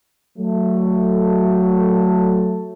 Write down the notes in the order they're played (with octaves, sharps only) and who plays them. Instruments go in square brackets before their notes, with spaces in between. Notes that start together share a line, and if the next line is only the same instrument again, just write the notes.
[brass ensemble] F#3 A3